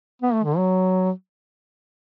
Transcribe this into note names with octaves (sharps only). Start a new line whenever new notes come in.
B3
A3
D3
F#3